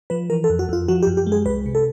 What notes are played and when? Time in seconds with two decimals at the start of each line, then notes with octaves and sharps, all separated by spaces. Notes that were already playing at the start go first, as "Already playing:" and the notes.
0.10 F3 B4
0.30 E3 A#4
0.44 A4
0.50 F2
0.59 F#4
0.69 F2 F4
0.88 F3 F#4
1.03 G4
1.07 F#2
1.17 G4
1.27 G#3
1.32 G#4
1.46 C2 B4
1.66 C3
1.75 A4